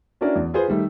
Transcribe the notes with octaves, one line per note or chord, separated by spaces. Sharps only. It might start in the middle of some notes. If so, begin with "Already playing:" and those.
C#4 D4 E4 F#4 A#4 D5
E2
F4 G#4 B4 C5
D#3 G3 A3